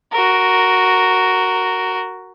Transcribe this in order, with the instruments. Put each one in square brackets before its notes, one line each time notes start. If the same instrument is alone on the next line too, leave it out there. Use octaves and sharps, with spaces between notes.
[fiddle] F#4 A#4